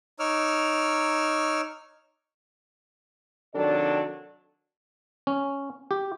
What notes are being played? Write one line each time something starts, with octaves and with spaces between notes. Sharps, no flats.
D#4 C#5 D6 E6 F6
C3 D#3 F#3 D4 A4 D5
C#4
G4